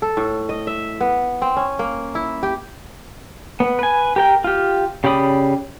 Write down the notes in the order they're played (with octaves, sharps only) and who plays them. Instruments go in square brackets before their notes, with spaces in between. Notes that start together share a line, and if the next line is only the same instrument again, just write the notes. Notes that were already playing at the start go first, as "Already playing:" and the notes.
[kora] A4
A2
D#5
E5
B3
C4
C#4
A#3
E4
G4
[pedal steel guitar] B3
B4 G#5
G4 A#4 G5
F4 G4
C#3 G4 D5 B5 D#6